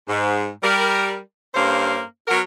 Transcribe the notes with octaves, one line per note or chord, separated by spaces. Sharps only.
G#2
G3 A#4
G2 A#3 C#4 A4 C5 F5
F#3 B3 F#4 A#4